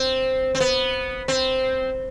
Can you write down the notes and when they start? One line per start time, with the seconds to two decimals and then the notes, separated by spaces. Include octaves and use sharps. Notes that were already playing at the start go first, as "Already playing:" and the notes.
Already playing: C4
0.55 C4
0.60 B3
1.28 C4